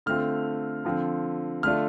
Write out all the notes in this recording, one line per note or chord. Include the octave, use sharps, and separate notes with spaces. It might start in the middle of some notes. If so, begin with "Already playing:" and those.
D3 A3 C4 F4 F6
D3 F3 C4 F4
D3 A3 D4 F4 F6